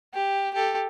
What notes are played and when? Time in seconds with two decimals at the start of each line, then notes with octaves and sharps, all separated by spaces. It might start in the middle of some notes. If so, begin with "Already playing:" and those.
0.14 G4
0.54 G4 A4